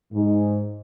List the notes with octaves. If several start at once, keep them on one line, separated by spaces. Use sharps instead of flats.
G#2